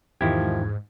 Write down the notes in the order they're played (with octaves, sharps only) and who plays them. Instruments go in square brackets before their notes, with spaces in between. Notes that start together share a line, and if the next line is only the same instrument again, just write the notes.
[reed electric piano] E2 G#6 [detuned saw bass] G#2 [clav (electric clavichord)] D#3 E4 G4 [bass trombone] F3